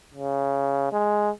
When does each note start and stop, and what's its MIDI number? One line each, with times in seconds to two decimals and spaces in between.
0.14 0.92 49
0.92 1.30 56